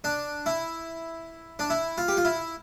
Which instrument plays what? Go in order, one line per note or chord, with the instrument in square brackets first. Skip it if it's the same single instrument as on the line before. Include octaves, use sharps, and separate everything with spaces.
[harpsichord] D4
E4
D4
E4
F4
G4
F4
E4